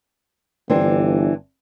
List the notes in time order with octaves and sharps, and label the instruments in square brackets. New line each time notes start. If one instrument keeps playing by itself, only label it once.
[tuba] G1 [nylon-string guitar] E3 C4 D4